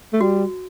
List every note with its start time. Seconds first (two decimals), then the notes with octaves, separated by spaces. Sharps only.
0.13 A3
0.21 G3 F#4